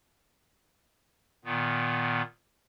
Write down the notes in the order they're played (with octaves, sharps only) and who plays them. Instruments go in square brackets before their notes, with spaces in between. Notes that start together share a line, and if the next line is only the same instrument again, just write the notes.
[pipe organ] A#2 D#3 B3